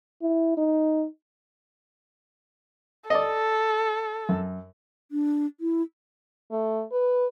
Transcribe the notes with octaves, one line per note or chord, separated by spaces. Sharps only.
E4
D#4
A4 D5 D#5
F#2
D4
E4
A3
B4